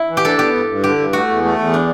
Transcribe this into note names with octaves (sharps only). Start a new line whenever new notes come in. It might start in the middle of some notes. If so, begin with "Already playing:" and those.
Already playing: E4
E3
G4
D4 A4
B3 G4
G2
G2
D3 G4
G2
A3 F#4
E2
A3
E2
D4